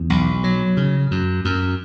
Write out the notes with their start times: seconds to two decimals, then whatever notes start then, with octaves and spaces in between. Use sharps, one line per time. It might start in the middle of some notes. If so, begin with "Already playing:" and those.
Already playing: E2
0.10 B1
0.44 F#3
0.77 C#3
1.11 F#2
1.45 F#2